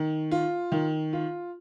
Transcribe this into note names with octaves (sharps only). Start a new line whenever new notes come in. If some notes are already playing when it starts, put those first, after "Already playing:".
Already playing: D#3
F4
D#3
F4